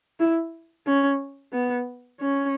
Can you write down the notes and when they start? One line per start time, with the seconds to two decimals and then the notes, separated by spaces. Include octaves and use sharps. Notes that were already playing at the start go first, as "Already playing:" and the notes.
0.20 E4
0.87 C#4
1.53 B3
2.20 C#4